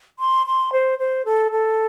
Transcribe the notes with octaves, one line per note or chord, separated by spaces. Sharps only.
C6
C6
C5
C5
A4
A4